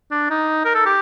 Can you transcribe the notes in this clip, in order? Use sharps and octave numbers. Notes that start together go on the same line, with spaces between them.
D4
D#4
A#4
A4
G4